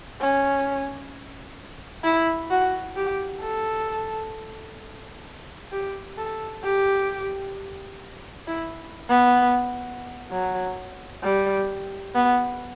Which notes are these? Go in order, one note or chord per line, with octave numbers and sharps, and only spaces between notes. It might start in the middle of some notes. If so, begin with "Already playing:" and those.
C#4
E4
F#4
G4
A4
G4
A4
G4
E4
B3
F#3
G3
B3